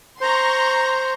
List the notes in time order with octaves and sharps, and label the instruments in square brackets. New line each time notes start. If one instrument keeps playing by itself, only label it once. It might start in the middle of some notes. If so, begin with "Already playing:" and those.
[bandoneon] C5 [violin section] A#5 C6 C#6